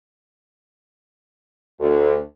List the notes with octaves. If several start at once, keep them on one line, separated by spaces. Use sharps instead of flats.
D2